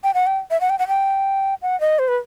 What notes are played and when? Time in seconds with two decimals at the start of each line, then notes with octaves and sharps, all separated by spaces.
0.04 G5
0.14 F#5
0.27 G5
0.51 E5
0.61 F#5
0.70 G5
0.79 F#5
0.88 G5
1.62 F#5
1.81 D#5
1.99 C5
2.08 B4